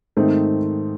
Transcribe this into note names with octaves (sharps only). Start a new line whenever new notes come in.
G#2 D#3 A3 C4 D#4